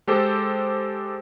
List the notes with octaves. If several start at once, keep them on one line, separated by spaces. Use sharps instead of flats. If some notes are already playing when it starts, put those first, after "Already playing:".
G#3 G4 A4 C5